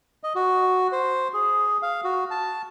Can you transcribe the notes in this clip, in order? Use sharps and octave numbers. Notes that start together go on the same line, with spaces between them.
D#5
F#4
C5
G#4
F5
F#4
A5